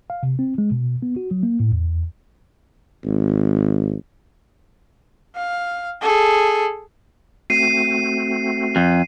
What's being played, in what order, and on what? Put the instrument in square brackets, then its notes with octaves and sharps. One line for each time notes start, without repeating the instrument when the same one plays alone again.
[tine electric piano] F5
C3
C4
G#3
B2
B3
F#4
F#3
A#3
A2
E2
[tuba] G#1
[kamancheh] F5
G#4 A4
[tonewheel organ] A3 C4 F#4 [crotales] C7 D#7
[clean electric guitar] F2